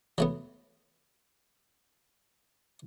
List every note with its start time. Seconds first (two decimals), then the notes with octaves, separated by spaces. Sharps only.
0.18 F#3 A3 B3